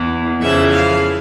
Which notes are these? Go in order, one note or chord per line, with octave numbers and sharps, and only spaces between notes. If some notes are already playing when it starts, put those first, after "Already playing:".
Already playing: E2 E3
F2 C#3 E3 E5
F5